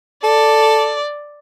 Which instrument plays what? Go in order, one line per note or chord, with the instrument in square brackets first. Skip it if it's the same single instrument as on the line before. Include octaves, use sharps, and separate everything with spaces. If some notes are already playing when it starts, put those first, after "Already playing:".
[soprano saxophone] A4 [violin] D5